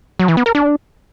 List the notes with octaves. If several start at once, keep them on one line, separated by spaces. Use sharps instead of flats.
F#3
E3
B3
A#4
D4